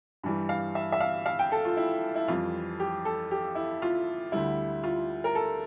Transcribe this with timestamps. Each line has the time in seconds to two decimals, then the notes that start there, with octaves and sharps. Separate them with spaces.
0.23 G2 E3 G3
0.49 F5
0.75 E5
0.92 E5
1.00 F5
1.26 F5
1.39 G5
1.52 A4
1.65 F4
1.77 E4
2.15 E4
2.28 F2 E3 G3 F4
2.80 G4
3.05 A4
3.31 G4
3.55 E4
3.82 F4
4.32 D2 D3 G3 E4
4.83 F4
5.24 A#4
5.35 A4